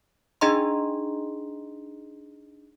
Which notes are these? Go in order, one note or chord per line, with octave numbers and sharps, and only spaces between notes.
D4 D#4 G#4 D#5 A#5 C6